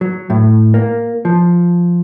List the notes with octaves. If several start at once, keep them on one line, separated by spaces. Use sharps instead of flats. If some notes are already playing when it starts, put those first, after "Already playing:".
F#3
A2
A#3
F3